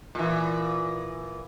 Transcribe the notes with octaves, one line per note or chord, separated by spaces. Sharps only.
A#2 E3